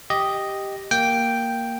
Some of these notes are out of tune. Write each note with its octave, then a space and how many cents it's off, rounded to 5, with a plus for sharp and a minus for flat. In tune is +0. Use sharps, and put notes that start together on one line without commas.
G4 +0 D#5 +0
A#3 -5 G5 +0